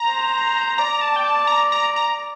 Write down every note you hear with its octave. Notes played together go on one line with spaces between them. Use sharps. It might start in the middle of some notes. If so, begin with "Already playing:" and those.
Already playing: A#5
C5
D5 A#5
A5
G5
A5
A#5
A#5
A#5